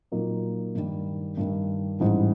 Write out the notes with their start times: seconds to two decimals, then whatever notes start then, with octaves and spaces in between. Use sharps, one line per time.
0.12 A#2 F#3 A#3 D#4
0.75 G2 D#3 G3
1.37 G2 D#3 G3
2.00 A1 G#2 E3 G3